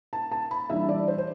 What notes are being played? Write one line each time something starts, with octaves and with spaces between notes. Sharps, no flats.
A5
A5
B5
E3 G3 D4 E5
D5
C5
C5